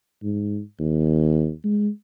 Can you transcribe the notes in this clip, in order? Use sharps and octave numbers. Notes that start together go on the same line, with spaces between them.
G#2
D#2
G#3